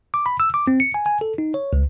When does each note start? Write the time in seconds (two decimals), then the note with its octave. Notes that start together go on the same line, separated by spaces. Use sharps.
0.14 D6
0.26 B5
0.40 E6
0.54 D6
0.67 C4
0.80 C#7
0.94 G#5
1.06 G#5
1.21 A4
1.38 D#4
1.54 C#5
1.73 C#2